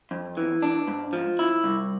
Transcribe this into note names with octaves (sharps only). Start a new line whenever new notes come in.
F2
E3
D4
G#2
F3
E4
C2